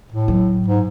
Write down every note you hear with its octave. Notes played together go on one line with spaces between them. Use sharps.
A2
F#3
G#2